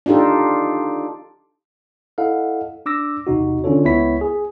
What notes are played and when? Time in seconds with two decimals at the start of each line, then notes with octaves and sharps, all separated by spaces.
0.06 D4 D#4 F4 G4 A4
2.18 E4 A4 D#5 F5 F#5
2.86 D4 D6 E6 A#6
3.27 B1 E2 C3 D#4 F#4
3.64 D3 C#4 D4 F4 A4 C#5
3.85 C#2 B3 E4 C#5 B6
4.21 G#4